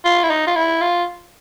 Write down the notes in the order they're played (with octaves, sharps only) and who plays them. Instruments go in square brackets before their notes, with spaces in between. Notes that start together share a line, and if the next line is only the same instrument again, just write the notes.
[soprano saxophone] F4
E4
D#4
F4
E4
F4